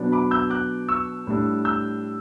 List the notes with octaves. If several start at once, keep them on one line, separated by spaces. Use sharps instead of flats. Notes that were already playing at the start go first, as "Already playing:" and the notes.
Already playing: B2 F#3 B3 D4
B5 D6
E6 G6
D6 F#6
C#6 E6
A2 G3 D4
E6 G6